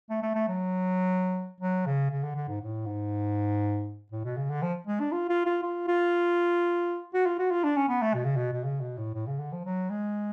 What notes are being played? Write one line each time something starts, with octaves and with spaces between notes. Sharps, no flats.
A3
A3
A3
F#3
F#3
C#3
C#3
D3
D3
G#2
A2
G#2
A2
B2
C#3
D3
F3
G#3
D4
F4
F4
F4
F4
F4
F#4
F4
F#4
F4
D4
C#4
B3
A3
B2
C#3
B2
B2
C#3
B2
A2
A2
C#3
D3
F3
F#3
G#3